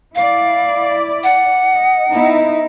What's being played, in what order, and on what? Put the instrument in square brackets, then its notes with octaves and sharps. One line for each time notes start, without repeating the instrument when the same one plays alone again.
[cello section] E4 D5 [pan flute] F5
[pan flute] F#5
[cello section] D#5
B3 D#4 E4